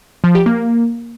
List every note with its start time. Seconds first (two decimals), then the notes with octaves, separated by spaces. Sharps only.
0.24 F3
0.35 G4
0.46 A#3